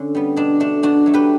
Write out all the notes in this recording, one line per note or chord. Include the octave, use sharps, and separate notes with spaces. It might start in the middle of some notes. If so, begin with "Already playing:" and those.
Already playing: D3 C#4
G3 B3
B2 D4
A3 D4
B2 D4 F#4
F#3 A3
G4 B4